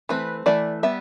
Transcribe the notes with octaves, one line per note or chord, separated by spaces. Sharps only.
E3 A3 C4 B4
E3 A3 D5
G3 B3 E5